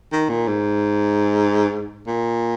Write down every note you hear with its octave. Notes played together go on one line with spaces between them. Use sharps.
D#3
A#2
G#2
A#2